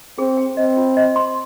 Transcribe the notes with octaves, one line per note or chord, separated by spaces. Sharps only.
C4 G#4
G5
C4 D#5
F4
D#5
C6